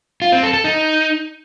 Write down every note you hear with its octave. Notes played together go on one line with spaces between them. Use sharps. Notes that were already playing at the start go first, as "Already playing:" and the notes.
F4
C4
A4
A4
D#4